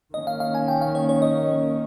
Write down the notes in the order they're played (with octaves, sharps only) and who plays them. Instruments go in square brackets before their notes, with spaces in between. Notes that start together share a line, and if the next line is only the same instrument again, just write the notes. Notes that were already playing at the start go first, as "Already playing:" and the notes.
[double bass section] D#3 A#3 C#4 [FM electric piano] D#5
[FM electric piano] F5
F5
G#5
G5
F5
C#5
C#5
D#5